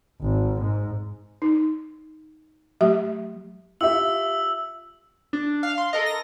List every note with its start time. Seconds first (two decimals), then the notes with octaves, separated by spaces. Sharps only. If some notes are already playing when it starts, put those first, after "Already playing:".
0.21 G#1
0.60 G#2
1.42 D#4
2.81 F#3 A3 G4 E5
3.81 F4 G4 E5 E6 F#7
5.33 D4
5.63 F5
5.78 C6
5.93 A4 A#4 D#5
6.06 A#6